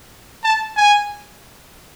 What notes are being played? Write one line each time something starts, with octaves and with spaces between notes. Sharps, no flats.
A5
G#5